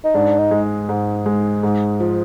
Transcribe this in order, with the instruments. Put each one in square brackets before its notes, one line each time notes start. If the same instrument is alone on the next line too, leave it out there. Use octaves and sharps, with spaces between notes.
[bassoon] D#4
[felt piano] G#2 [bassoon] D4
[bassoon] D#4
[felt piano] G#3
G#2
G#3
G#2
F3